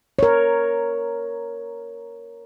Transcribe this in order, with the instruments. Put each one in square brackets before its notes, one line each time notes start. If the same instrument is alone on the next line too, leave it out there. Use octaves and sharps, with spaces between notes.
[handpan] A#4 C#5